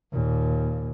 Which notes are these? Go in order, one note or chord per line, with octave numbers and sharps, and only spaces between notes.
D#2 A#2